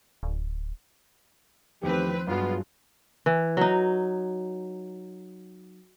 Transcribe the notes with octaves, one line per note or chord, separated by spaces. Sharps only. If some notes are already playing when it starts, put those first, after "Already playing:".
D1
E2 D#3 F3 A3 C4 G4 B4
G2 F#3 G#3 B3 F4
E3
F#3 D#4